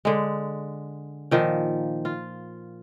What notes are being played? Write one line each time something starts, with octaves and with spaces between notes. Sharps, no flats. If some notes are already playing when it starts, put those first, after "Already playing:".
D3 G#3
A#2 D#3 F3
F4